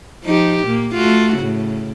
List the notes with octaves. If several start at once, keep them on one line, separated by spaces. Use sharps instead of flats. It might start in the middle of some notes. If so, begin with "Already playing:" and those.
F3 D#4 G4
A#2 A#3
A3 F4 F#4
A2 C#3